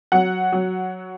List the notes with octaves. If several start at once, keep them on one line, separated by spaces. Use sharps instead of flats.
F#3 F#5
F#3